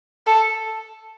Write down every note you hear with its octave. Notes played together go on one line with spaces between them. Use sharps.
A4